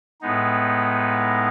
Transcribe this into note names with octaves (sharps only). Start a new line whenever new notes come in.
A2 G#3 B3 D#4